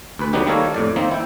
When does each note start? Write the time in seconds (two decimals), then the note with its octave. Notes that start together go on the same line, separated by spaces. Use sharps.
0.19 D2 B4
0.33 D3 F#3 B3 D#4 G4
0.47 D#3 G3 A#3 A4 A#4 C#5
0.74 F2 A2 D5
0.96 D#3 A#3 C4
1.11 E4 G5